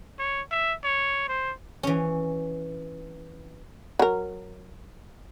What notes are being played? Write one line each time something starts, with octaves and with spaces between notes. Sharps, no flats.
C#5
E5
C#5
C5
E3 C#4
F#3 A#4